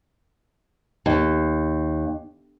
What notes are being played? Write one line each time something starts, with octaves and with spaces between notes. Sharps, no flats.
D#2